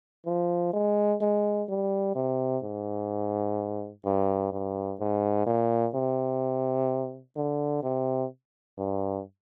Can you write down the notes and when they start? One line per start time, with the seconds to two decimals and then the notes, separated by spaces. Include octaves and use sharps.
0.26 F3
0.73 G#3
1.21 G#3
1.69 G3
2.15 C3
2.63 G#2
4.05 G2
4.52 G2
5.00 G#2
5.46 A#2
5.94 C3
7.36 D3
7.83 C3
8.78 G2